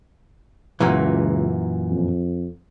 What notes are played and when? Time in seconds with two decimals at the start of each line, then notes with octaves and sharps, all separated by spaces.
0.80 C#2 F#2 A#2 E3
1.91 F2